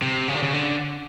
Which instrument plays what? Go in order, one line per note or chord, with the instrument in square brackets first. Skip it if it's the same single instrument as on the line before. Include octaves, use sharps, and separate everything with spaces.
[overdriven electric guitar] C3
C#3
D3
C#3
D3